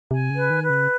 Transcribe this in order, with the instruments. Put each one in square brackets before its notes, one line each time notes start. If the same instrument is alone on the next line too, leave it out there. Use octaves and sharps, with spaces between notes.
[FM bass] C3 [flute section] G#5
[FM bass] C#3
[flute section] B4
[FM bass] D#3
[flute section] B4
[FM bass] C#3